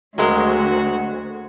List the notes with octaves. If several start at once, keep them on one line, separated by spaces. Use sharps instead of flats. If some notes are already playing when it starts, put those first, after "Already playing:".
D2 F#3 G#3 A#3 C4 F#4 A#4